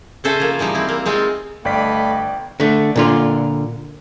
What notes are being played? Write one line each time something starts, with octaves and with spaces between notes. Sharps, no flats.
C#3 C#4 A4 C5 E5 G#5
F3 A#3
E3 F3 G3 D#4
C4 E4
A#3
G#3 C4 D#4 F4
G1 A3 D5 D#5 F5 G5 B5 B6
D3 A3
A#2 D3 F4